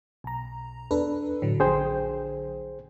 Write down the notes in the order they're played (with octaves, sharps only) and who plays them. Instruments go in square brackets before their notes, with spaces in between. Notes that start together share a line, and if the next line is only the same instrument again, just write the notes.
[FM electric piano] B1 A#5
[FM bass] E2 [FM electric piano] D4 A4 B4
[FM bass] A2 [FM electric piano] D3 F#3
[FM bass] A#1 [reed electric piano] G#4 C5 G5